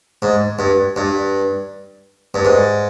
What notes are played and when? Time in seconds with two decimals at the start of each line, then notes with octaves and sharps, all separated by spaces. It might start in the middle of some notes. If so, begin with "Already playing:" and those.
0.22 G#2
0.59 G2
0.96 G2
2.34 G2
2.45 G#2